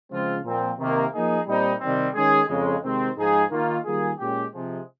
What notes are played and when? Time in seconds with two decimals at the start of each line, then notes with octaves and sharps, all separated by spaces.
0.11 C#3 F3 G#3 C4 F4
0.44 A#2 F3 C4
0.79 C3 D#3 A#3
1.13 F3 A#3 D#4 G#4
1.47 A#2 G3 C4 D#4
1.81 C3 D#3 G3 C4
2.15 D#3 G#3 C#4 G#4
2.49 F2 C#3 G#3
2.83 C3 D#3 G#3 C4
3.17 G#2 F3 G#3 D#4 G#4
3.51 D#3 A#3 F4
3.85 D#3 G3 A#3 F4 G#4
4.19 A#2 G#3 C#4 G4
4.53 C3 F3 G#3